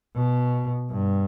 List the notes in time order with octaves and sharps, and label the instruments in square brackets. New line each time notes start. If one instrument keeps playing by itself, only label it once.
[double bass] B2
G2